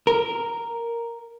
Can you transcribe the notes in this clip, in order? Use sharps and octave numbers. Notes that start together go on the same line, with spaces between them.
A#4